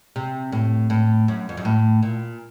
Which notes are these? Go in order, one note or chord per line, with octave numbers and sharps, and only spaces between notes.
C3
A2
A2
F#2
F2
F#2
A2
A#2